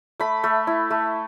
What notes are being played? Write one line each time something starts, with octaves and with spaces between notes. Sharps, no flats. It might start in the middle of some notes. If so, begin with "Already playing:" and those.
A3 B5
A3
E4
A3